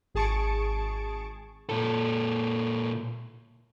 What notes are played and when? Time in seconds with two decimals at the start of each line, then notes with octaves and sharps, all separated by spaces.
0.14 G#1 G#4 A5 C#6 C#7 D7
1.69 A#2 A4